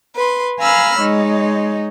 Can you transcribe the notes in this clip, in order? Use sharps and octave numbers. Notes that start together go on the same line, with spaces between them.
B4 C6
F5 G#5 A#5 B5 E6 F6
G#3 D#4 C#5